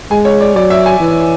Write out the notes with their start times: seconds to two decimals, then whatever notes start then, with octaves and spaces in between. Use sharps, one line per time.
0.11 G#3 G#5
0.25 C#5
0.41 D5
0.55 F#3 D5
0.70 E5
0.86 G#5
1.00 E3